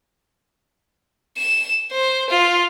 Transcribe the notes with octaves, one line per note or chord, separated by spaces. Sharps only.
E7
C5
F4